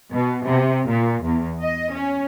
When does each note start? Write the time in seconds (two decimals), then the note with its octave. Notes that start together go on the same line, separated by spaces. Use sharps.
0.13 B2
0.45 C3
0.89 A#2
1.23 E2
1.61 D#5
1.94 C#4